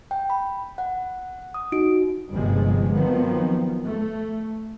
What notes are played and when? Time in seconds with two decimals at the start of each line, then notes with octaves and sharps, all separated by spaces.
0.11 G5
0.30 B5
0.78 F#5
1.54 D#6
1.72 D#4 F#4 D7
2.31 G1 C3 F3 G3 G#3
2.96 D#3 F3 F#3 B3 C4
3.84 A3